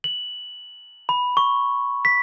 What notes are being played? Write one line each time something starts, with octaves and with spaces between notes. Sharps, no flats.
F#7
B5
C#6
B6